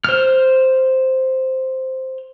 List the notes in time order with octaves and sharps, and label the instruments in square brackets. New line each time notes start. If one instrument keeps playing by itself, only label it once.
[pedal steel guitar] C5 F6